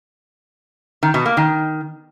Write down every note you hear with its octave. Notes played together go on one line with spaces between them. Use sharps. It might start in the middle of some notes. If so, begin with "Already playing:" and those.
D#3
B2
A#3
D#3